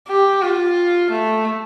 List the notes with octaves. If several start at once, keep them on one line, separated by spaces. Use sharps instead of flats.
G4
F4
A3